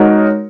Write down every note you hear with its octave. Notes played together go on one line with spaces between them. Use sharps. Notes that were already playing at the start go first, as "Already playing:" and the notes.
Already playing: G#3 D#4 F#4 A#4 C#5